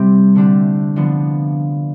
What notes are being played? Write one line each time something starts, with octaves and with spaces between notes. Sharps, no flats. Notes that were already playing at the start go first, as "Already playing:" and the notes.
Already playing: C3 G3 C4 G4
D3 A3 D4 G4
D3 F3 B3